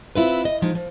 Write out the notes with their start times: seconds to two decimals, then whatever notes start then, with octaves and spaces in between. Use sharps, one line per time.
0.15 C4 E4 F4 B4
0.45 D#5
0.62 F3 G#3 D#4
0.75 F3